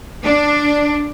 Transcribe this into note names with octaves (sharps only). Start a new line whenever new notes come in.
D4